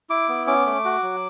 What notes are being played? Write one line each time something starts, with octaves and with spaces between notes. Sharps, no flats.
E4 D6
B3
C#4 D6
A3
F#4
F#3